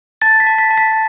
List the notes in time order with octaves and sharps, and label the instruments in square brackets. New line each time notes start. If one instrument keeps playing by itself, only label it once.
[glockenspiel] A5 A6
B6
A5
B6
A5
B6